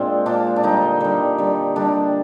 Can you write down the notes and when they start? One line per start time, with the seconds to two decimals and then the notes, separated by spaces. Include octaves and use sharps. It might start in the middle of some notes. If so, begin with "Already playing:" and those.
Already playing: A#2 G#3 C4 D4
0.26 A#2 G#3 D4
0.56 D4
0.63 D3 G3 D#4
1.01 D3 G3
1.38 D3 G3
1.76 D3 G3 D4